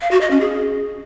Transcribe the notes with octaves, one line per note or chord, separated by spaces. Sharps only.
F5
F#4
D#5
C#4
G#4